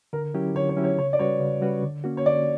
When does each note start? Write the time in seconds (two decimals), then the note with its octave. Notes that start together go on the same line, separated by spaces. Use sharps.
0.13 D3 A#4
0.34 F#3 C#4 E4 G4
0.55 D3 C#5
0.69 C#5
0.77 F#3 C#4 E4 G4
0.84 C#5
0.98 C#3 C#5
1.13 D5
1.19 G3 C#4 F#4 B4 C#5
1.40 C#3
1.61 G3 C#4 F#4 B4
1.83 D3
2.04 A#3 C#4 F#4
2.17 C#5
2.26 D3 D5